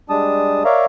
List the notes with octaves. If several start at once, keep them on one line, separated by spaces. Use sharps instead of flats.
G3 G#3 D4 A5 D#6
A#4 C#5 D5 E5 F5 A#5